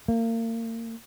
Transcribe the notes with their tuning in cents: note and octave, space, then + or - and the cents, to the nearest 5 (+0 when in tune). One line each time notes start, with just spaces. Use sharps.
A#3 -35